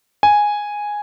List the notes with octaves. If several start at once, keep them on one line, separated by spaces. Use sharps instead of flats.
G#5